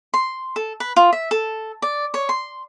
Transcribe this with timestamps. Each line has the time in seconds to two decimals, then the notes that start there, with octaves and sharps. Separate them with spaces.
0.14 C6
0.56 A4
0.80 B4
0.96 F4
1.12 E5
1.31 A4
1.82 D5
2.14 C#5
2.29 C6